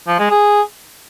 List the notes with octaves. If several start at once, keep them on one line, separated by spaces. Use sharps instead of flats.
F3
G#3
G#4